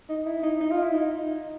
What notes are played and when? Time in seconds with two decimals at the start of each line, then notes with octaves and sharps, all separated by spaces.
0.09 D#4
0.26 E4
0.43 D#4
0.61 D#4
0.71 F4
0.83 E4
0.94 D#4